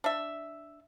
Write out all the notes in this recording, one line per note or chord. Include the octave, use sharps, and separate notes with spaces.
D4 E5